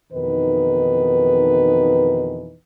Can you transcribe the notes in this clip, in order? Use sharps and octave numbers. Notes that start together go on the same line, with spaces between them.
F2 B2 D#3 E3 D#4 B4